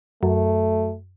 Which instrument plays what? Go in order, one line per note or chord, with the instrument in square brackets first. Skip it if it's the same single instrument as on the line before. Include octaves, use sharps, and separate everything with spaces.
[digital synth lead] F#2 [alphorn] A3